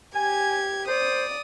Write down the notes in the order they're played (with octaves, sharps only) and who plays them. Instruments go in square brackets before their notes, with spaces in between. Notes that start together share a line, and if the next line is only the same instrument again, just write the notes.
[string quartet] G4 G#6 [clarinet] G#5
[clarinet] C5 [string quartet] D5 D#6